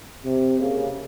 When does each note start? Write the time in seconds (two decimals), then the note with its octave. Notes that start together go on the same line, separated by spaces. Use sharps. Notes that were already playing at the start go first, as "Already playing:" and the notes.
0.24 C3
0.60 C#3 A#3